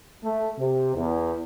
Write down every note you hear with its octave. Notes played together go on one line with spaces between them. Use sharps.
A3
C3
E2